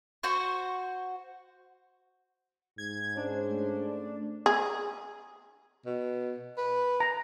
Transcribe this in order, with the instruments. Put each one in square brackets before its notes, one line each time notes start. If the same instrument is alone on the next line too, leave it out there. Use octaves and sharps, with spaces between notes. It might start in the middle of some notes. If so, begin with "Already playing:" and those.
[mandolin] F#4 C5 C#6
[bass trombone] G#2 [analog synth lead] G#6
[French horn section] G#3 C#4 C5 [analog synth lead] D4
[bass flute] A3
[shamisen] G#4
[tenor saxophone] B2
B4
[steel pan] A#5